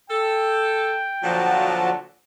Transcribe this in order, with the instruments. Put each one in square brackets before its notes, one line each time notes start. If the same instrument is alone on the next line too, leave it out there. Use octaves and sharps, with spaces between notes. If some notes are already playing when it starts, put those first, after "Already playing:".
[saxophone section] A4 [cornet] G5
[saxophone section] A#2 D3 F#3 [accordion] F3 F#4 A5